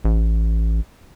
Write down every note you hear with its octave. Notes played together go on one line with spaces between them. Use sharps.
A1